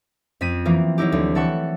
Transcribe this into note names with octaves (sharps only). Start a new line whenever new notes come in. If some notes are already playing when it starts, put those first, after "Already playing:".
F2 C4 B6 D#7
E3 F3 A#3
F#3 A#3 D#4 E4 G4
D2
E3 A4 F#5 C#6